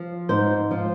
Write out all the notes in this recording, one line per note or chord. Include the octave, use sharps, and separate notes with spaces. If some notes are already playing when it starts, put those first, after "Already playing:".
Already playing: F3
G#2 C5
F3